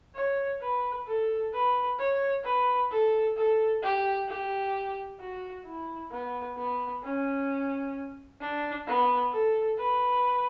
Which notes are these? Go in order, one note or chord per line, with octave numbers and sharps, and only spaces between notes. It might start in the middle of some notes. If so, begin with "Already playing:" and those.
C#5
B4
A4
B4
C#5
B4
A4
A4
G4
G4
F#4
E4
B3
B3
C#4
D4
B3
A4
B4